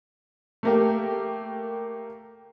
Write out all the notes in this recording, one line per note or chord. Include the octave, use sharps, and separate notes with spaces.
A3 A#3 G4